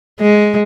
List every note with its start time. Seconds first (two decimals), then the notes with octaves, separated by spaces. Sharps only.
0.21 G#3